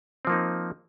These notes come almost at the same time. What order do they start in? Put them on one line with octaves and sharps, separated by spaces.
C4 F3 A#3 D#4